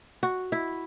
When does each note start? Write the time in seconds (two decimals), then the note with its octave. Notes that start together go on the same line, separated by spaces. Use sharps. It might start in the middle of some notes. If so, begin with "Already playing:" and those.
0.23 F#4
0.52 E4